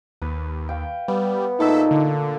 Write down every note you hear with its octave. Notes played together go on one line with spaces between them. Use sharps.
D#2 B4
F5 G5
G3 B3
A#2 A3 D#4 A4 E5
D3